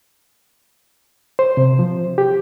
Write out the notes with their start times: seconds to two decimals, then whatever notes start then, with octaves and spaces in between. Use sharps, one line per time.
1.39 C5
1.57 C3
1.79 F3
2.18 G4